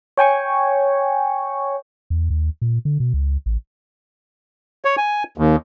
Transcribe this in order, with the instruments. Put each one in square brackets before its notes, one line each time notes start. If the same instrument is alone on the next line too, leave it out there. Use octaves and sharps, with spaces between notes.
[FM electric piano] C#5 G5 G#5 C#6
[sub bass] E2
D#2
A#2
D3
B2
C#2
A1
[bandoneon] C#5
G#5
D#2